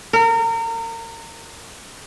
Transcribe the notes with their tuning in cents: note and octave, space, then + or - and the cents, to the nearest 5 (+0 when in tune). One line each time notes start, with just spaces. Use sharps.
A#4 -30